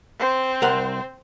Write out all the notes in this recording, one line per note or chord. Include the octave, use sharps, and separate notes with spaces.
C4 C5
C2 A#4 F#5